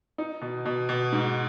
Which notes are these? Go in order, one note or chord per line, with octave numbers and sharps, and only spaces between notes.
D#4
B2
B2
B2
G#2